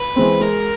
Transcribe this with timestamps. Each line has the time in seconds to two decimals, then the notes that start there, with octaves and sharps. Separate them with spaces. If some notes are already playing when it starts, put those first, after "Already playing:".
Already playing: B4
0.16 E3 G#3 C4
0.40 G#3 A#4